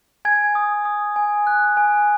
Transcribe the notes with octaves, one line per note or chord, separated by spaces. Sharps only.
G#5 G#6
D#6
D#6
G#5
F#6
G#5